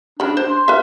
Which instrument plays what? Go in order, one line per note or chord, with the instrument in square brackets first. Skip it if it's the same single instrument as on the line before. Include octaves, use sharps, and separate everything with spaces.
[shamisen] C#3 B5 [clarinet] D4
[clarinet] D4 [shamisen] C5
[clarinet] C6
[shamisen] B4 E5 [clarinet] F5